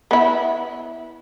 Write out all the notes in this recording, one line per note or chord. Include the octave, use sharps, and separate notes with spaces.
B3 E4